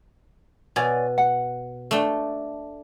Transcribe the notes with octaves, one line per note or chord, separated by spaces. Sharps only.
B2 C#5 D5 G#5
F#5
A3 D4 G5